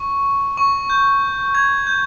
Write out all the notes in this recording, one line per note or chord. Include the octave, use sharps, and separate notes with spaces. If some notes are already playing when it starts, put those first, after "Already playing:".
Already playing: C#6
C#6
G6
G#6
G6